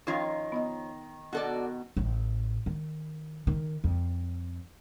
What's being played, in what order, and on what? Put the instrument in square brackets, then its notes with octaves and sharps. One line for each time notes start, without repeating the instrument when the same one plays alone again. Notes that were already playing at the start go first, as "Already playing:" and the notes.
[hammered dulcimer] D#3 [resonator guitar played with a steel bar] F3 F4 C#5 [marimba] C#4 D#4
[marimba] B3 D#4 D#5
[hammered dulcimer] B2 [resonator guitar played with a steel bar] F#4 A4 D5
[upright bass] A1
D#3
D#3
F2